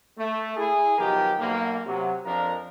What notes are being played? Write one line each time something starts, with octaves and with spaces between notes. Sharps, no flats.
A3
E4 G#4
B1 D#3 F3 G4 A#4
B1 A#3
C3 F#3
F2 F3 D4 A#4